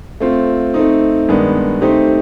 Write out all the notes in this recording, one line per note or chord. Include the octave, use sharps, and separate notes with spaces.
A3 C4 F4
A3 C4 D#4
G2 D#3 G#3 B3 D4
A3 C4 D#4 G4 C5